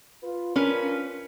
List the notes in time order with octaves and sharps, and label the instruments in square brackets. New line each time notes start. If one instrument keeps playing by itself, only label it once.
[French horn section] F4 B4
[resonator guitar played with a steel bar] C#4 B4 [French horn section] D4 F4 A#4